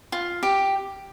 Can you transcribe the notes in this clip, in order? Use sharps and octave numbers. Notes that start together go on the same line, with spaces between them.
F4
G4